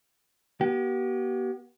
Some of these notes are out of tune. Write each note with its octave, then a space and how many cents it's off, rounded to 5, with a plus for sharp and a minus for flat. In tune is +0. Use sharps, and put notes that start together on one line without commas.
B3 -40 G4 -40